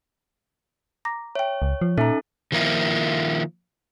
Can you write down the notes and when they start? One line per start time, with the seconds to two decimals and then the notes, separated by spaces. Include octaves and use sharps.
1.05 A#5 D6 A#6
1.35 C#5 E5 G5
1.62 C#2
1.81 F3
1.98 A#2 C#4 D#4 A4 E5 A#5
2.52 D#3 F3 A#3 E4 F4